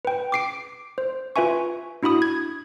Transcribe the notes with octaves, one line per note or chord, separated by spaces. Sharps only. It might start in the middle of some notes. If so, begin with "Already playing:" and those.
B4 G5
D6 C7 D7
C5
F4 B4 E5 G#5 C#6
D4 E4 F#4 B5 D#6
G#6